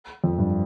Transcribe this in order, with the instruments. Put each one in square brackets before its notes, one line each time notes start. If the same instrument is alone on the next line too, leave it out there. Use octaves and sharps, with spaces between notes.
[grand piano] F2
G2